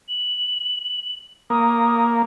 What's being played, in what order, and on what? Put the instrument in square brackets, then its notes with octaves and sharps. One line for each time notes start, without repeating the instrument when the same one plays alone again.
[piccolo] F#7
[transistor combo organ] A#3 [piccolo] D#6